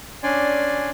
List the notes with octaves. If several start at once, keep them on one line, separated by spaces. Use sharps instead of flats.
C#4 D4 D5 G#5 C6